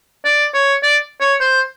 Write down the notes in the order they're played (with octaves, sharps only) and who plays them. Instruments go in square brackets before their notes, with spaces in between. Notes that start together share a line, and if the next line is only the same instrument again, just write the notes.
[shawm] D5
C#5
D5
C#5
C5